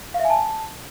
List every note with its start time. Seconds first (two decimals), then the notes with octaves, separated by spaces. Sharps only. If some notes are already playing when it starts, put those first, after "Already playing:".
0.14 F5
0.20 E5
0.25 G#5
0.30 A5